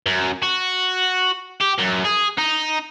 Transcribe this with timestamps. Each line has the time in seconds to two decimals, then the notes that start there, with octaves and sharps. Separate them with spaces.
0.06 F#2
0.43 F#4
1.60 G4
1.78 F#2
2.05 G#4
2.38 D#4